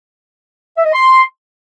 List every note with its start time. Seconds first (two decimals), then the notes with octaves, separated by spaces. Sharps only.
0.77 E5
0.85 D#5
0.94 C6